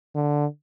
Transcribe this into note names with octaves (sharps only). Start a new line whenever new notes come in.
D3